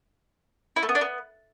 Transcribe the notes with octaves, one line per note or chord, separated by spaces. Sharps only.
E4
A3
B3
D4
B3